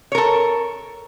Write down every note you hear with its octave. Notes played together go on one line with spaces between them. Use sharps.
A4 A#4 C#5